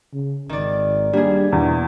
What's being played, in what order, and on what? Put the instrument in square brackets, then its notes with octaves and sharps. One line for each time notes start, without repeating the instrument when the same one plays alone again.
[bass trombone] C#3
[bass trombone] G#1 [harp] D#3 D5
[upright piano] G3 [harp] A#3 G#4 [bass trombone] D4
[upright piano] E2 [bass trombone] B2